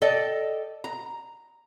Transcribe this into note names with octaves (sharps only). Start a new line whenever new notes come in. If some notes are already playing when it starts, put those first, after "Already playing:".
A4 D5 D#5 G5
A#5